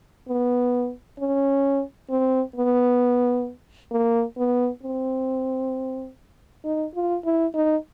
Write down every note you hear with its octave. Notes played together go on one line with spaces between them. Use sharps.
B3
C#4
C4
B3
A#3
B3
C4
D#4
F4
E4
D#4